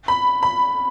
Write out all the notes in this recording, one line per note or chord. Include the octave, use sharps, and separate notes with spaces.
B5
B5